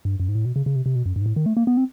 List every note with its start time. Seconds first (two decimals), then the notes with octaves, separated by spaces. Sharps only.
0.05 G2
0.20 F#2
0.28 G#2
0.35 A2
0.45 B2
0.56 C#3
0.66 C#3
0.75 C3
0.86 C3
0.95 B2
1.06 F#2
1.16 G2
1.21 G#2
1.26 A2
1.36 D#3
1.46 A3
1.57 A#3
1.67 B3
1.77 C4